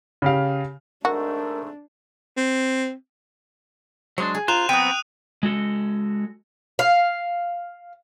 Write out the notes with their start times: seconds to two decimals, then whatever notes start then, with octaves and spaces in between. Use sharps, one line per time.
0.22 C#3 G4 F5
1.05 G#2 A3 D4 F#4 A#4
2.37 C4
4.18 F#3 G#3 D4 C5
4.35 G#4
4.48 F4 C5 A#5 F#6 F7
4.69 F#3 B3 C4 G5 D#6 D#7
5.43 G#3 F#4 A4
6.79 F5